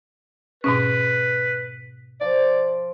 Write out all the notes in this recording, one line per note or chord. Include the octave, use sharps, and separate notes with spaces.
G#2 B2 C#4 B4
F3 D5